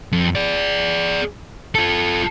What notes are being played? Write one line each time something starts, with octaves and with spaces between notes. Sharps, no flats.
F2
G#4 D5
F4 A4